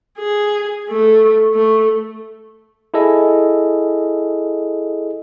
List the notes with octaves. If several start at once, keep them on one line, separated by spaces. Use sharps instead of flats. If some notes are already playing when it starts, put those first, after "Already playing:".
G#4
A3
A3
E4 G#4 A4 D#5